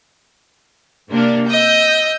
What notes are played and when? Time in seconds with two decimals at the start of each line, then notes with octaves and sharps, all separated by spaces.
1.11 C3 A#3 D4
1.50 D#5 E6 G6